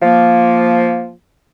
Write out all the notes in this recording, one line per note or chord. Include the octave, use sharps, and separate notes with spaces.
F3 A#3